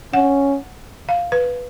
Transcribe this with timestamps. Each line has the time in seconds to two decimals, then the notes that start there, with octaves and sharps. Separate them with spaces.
0.13 C#4 F#5
1.09 F5
1.32 B4